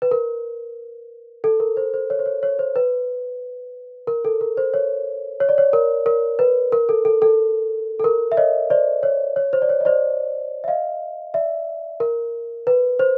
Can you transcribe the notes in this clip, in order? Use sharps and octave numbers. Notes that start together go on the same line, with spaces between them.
B4
A#4
A4
A#4
C5
C5
C#5
C5
C#5
C#5
C5
B4
A#4
A4
A#4
C5
C#5
C#5
D5
C#5
A#4
A#4
B4
A#4
A4
A4
A4
A4
A#4
E5
C#5 D#5
C5 D5
C#5
C#5
C5
D5
C#5
D#5
C5 D5
E5
D#5 F5
D5 E5
A#4
B4
C5